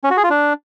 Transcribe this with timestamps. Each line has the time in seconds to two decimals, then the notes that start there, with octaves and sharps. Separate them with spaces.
0.04 C#4
0.10 F#4
0.17 G#4
0.24 F4
0.30 D4